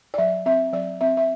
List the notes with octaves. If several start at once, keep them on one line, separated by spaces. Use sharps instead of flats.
D5
F#3 E5
C4 E5
F#3 D5
C4 E5
E5